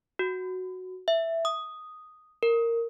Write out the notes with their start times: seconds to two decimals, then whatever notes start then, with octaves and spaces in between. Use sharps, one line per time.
0.19 F#4
1.08 E5
1.45 D#6
2.43 A#4